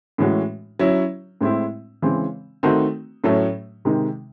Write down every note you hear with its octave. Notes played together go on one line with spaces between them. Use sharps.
A2 E3 G#3 C#4 F#4
F#3 C#4 E4
A2 G#3 C4 E4
C#3 E3 G#3 C4
D#3 A3 C4 D#4 F#4
A2 F#3 A3 C#4
C3 D#3 G#3 D#4